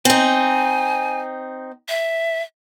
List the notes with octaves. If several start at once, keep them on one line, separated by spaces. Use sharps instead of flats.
C4 D#4 G#5
E5